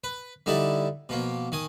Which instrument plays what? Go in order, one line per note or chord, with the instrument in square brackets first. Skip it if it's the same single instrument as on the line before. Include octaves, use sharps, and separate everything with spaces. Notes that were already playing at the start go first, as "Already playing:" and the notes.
[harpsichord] B4
D3 G3 D#4 E4 A5
B2 F3 A#3
D#3 G#5 D#6